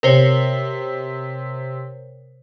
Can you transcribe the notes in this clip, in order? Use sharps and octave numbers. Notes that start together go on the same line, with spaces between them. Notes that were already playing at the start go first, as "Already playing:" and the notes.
C3 A#4 C5 C#5